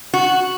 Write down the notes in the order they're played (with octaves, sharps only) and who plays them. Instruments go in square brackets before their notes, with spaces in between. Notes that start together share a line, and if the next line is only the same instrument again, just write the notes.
[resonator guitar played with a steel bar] F#4